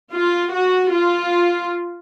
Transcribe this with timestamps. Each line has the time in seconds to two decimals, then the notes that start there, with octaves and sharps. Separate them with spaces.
0.12 F4
0.53 F#4
0.94 F4